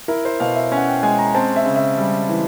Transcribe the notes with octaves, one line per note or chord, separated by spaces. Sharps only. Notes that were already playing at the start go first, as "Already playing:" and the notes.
E4 A#4
C5
B2 F5
E5
C#4
F#5
G5
G#3 G#5
A#5
C4 A5
E5
C#3
E5
G3
E3